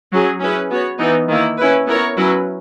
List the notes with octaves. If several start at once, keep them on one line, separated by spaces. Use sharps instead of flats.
F#3 C#4 G#4
C#4 E4 G#4 B4
B3 F#4 C#5
E3 B3 D#4
D#3 A#3 E4
C#4 E4 B4
B3 E4 A#4 C#5
F#3 C#4 E4 B4